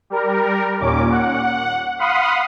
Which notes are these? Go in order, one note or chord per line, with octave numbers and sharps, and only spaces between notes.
G3 A#4
D#2 A#2 C#4 D6
F#5
F5 F#5 B5 C6 D#6